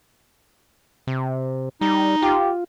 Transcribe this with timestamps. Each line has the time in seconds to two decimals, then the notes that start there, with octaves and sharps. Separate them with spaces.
1.07 C3
1.81 G3 D#4
2.22 F4 G4